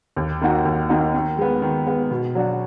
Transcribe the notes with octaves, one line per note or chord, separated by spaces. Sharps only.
D#2
D#3 A#3 D#4 F#4
D#2
D#3 A#3 D#4 F#4
D#3
G#3 B3
D#3
G#3 B3
B2
F#3 D4 F#4